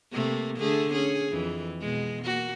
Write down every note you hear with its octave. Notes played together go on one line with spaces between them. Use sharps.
C3 A3 A#3
D3 A3 G#4
C#4 G#4
F2 E3
B2 G#3
A#3 F#4